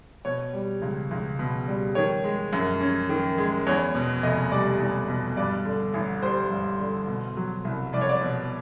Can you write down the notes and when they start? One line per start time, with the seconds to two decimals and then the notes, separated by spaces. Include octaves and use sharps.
0.25 B2 C#5
0.53 G3
0.82 C#2
1.11 C#2
1.39 B2
1.67 G3
1.95 D#3 C#5
2.24 G#3
2.53 F#2
2.81 C#4
3.09 D#3
3.38 G#3
3.66 E2 C#5
3.95 B2
4.23 F1 D#5
4.52 G3 D5
4.80 E2
5.08 B2
5.37 G2 D5
5.65 D3
5.94 A1
6.22 G3 C5
6.51 G2
6.80 D3
7.07 B2
7.37 F#3
7.65 C2
7.93 C2 D5
8.01 C#5
8.09 D5
8.21 B2